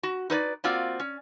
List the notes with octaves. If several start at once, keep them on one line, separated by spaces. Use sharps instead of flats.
F#4
D#4 B4 C#5 D5
A#3 C4 F4 F#4 D5
C#4